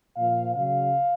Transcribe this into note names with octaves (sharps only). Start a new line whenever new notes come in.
A#2 F3 F5
C#3 F#3 F5